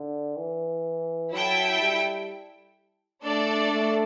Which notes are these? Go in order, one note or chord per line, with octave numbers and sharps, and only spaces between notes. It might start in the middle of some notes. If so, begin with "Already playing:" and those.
Already playing: D3
E3
F#3 E4 A4 E5 G5
G3
A3 D4 A4 D5
A3